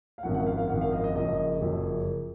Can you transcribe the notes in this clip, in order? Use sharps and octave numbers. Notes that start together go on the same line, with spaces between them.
F5
G#1 F#2 F3 F#5
F#5
F5
F5
G#1 F#2 F3 F#5
F5
D#5
D#5
F#1 F#2 F3 D#5
F#1 F#2 F3